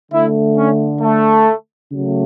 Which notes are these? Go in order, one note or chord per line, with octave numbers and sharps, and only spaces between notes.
D3 A3 E4
C#4
A3
C#3 F#3 A3